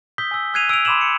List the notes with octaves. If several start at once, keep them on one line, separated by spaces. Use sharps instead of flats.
D#6 E6 G6 B6 G7
G#5 E6
E6 F#6 G#6 C7 D#7 F7
E6 D7 D#7 F7
B5 C6 D6 G#6 E7 F#7
C#7